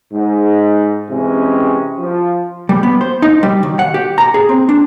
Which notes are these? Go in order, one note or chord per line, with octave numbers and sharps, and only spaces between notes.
G#2
C3 E3 G#3 C#4
F3
G3
B3
C5
D#4
G3
D#3
F#5
G4
A#5
G#4
C4
D4